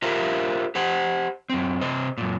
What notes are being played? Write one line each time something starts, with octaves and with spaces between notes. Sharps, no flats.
F4 G4 A#4 C5 E5 F5
G4 C5 F#5
F#2 C4
C3 C5 D#5
F#2 A#2